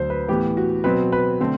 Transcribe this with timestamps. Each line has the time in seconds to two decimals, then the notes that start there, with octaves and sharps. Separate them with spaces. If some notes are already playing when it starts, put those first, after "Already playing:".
Already playing: D2 D3 F#3 C5
0.10 B4
0.28 A2 E3 B3 G4
0.57 F#4
0.84 B2 F#3 C4 B4
1.12 B4
1.40 D3 A3 C4